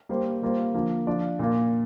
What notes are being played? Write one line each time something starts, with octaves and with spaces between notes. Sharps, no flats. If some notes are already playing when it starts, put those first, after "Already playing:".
G3 A#3 G4 C5
G3 A#3 F4 C5
D3 F3 A#3
F3 D4 F4 D5
A#2 A#3 F4